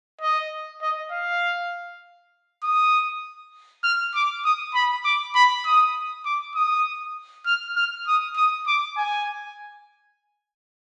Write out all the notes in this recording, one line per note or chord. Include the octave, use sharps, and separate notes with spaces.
D#5
D#5
F5
D#6
F6
D6
D#6
B5
D6
B5
D#6
D6
D#6
F6
F6
D#6
D#6
D6
G#5